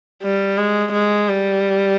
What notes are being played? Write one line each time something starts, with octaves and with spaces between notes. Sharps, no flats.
G3
G#3
G#3
G3